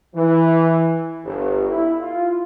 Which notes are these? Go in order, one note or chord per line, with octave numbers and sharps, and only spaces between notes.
E3
G1
E4
F4